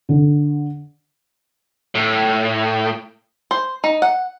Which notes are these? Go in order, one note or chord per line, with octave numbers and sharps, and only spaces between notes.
D3
A2
C5
D#4
F#5